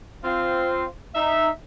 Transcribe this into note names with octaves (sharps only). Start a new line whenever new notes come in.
C4 F4
D#4 E5